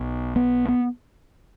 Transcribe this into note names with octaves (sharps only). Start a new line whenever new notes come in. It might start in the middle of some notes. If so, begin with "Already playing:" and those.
Already playing: B1 B2
B3
B3